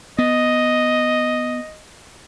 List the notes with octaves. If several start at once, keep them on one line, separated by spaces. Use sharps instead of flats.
B3 D#5